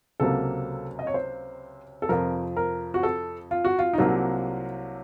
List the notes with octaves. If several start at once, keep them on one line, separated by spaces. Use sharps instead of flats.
C#2 C3 F#3 A#3 A4
D#5
C#5
C5
A4
F2 C3 F3 A#4
A#4
F#4
A4
F4
F#4
F4
D#4
C2 C3 F#3 A#3 F4